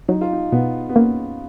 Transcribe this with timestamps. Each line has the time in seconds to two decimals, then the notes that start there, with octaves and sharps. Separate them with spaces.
0.08 F#3 D#4
0.21 F4
0.33 D#4
0.52 B2 B3
0.89 B3
0.96 A#3 C#4